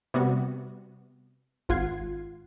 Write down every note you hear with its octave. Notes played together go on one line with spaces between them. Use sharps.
C3 G3 B3 F#4
G#1 F4 F#5 G#6 C7